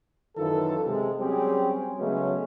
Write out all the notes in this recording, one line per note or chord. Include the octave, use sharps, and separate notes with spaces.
F#2 D#3 E3 F4 A4
C3 G#3
F#3 G3 C4 C#4 G4 G#4
C#3 F#3 G#3 A3 B3 C#4